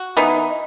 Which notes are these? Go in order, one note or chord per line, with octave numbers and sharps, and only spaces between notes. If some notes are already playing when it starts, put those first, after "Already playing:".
Already playing: F#4
E3 B3 D#4